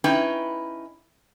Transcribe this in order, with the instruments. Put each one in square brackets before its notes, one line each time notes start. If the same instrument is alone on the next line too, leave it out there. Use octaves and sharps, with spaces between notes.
[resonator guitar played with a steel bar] C#4 D#4 E4 B4 G5